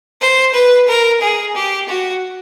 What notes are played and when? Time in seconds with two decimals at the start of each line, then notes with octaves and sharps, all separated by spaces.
0.21 C5
0.54 B4
0.88 A#4
1.21 G#4
1.56 G4
1.89 F#4